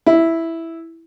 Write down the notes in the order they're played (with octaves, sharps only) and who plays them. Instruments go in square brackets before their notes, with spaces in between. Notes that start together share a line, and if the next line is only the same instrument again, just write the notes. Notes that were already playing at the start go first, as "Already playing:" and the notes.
[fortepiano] E4